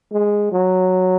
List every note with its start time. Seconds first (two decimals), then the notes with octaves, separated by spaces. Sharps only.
0.12 G#3
0.52 F#3